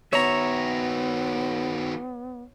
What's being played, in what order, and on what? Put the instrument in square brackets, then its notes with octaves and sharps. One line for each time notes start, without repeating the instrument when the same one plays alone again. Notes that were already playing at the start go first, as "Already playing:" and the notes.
[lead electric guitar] D#3 F#4 [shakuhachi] B3 [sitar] C#5 [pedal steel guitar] E5 A#5